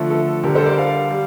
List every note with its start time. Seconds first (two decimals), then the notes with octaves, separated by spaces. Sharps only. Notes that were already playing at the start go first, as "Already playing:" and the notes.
Already playing: D3 F3 A3
0.10 A4
0.43 D3 G3 G4 A#4
0.55 A4 C5
0.66 A#4 D5
0.78 D5 F5
1.11 G3